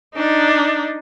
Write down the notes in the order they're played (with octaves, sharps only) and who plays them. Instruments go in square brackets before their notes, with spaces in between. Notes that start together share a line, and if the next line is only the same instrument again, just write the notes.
[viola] D4 D#4